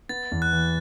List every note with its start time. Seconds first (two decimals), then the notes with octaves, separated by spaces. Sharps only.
0.09 B3 A6
0.32 E2
0.42 F#6
0.53 E3